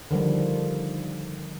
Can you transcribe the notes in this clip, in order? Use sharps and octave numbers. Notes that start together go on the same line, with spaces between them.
D3 D#3 F3 G3